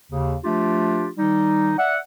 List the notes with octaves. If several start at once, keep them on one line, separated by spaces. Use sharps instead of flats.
D#2 C#3
F3 A3 D4 F4 G4
D#3 G3 D#4
D5 E5 F#5